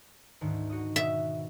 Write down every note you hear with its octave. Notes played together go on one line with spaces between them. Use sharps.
D2 G#2 D#3
F#4 D#5 D#6
B2 E5